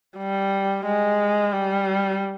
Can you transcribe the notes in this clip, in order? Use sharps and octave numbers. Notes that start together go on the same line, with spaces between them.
G3
G#3
G3